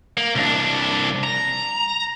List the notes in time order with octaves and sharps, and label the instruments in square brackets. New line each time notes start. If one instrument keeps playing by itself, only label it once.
[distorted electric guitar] A#3
C2 D4
A#5